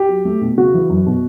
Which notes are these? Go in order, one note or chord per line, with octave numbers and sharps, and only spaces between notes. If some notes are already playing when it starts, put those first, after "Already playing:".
Already playing: G4
F#3
A3
B2
C#3 F#4
E3
F#2
B2